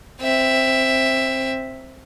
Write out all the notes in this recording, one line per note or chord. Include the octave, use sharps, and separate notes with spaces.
C4 E5